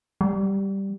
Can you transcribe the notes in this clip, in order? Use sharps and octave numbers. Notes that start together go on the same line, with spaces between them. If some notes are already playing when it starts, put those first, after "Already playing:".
G3